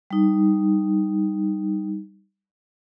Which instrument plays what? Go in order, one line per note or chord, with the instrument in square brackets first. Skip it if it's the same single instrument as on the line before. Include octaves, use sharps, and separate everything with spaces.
[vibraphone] G3 D#4